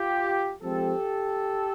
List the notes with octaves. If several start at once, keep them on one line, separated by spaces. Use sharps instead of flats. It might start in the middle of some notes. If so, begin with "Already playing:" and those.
Already playing: F4 G4
F3 G#3 C4 G4 A4